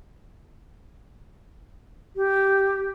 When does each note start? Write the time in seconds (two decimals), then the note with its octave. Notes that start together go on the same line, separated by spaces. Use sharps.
2.15 G4